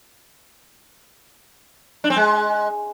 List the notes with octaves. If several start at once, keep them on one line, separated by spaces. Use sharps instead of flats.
D4
C4
G#3